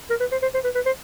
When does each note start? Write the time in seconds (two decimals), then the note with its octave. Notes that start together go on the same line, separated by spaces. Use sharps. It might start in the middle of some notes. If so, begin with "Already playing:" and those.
0.10 A#4
0.20 B4
0.32 C5
0.43 C5
0.54 C5
0.64 B4
0.75 B4
0.86 C5